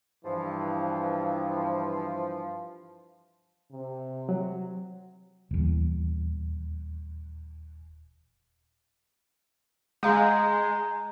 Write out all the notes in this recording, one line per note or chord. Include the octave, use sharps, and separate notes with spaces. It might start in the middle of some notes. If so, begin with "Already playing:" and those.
G2 E3 F3
C3
F#3
D#1 E2
G#3 G#4 F5 F#5 A#5 G6